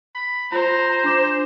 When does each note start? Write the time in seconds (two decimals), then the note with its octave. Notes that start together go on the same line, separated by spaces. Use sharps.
0.15 B5
0.52 F4 C5 A#5
1.04 D4 D6 E7